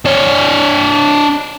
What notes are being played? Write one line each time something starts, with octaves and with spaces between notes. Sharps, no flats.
D4 C#5